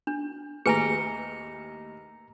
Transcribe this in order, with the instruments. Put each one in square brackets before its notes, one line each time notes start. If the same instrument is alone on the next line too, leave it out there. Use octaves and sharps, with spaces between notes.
[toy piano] D4
[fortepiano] D#2 A2 [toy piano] G#4 B4 G#5 [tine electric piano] A#5 C#7